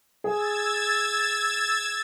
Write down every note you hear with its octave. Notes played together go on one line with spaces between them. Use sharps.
G#4 E6 G#6 A6